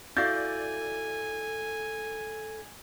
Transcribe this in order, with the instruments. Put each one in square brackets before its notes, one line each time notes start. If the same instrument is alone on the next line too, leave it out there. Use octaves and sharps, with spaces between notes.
[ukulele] E4 F#4 F5 [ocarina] A4 [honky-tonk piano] D5 G6 A6 [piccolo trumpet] G#5